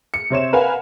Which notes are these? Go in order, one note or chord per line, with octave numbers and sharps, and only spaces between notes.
C#7
C3 C4 C#5 E7
A#4 B4 F5 F#5 G#5